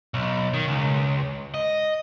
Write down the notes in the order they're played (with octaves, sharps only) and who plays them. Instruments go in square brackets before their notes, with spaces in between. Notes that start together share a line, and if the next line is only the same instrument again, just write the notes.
[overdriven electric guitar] B1
D#3
C#2
D#5